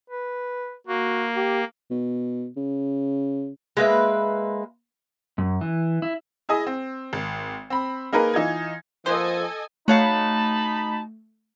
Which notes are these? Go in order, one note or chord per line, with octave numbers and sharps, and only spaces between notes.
B4
A#3 F#4
G4
B2
C#3
G#3 A#3 B4 E5
F#2
E3
E4
E4 G#4 D#5 G#5 D#6
C4
G#1
C4 B5
A#3 D#4 G#4 A#4 B4
E3 D#4 F4 G#6
F3 A#3 B3 A4 C5 D#5 G#5
A3 D#4 F#4 C#5 F5 A5 B5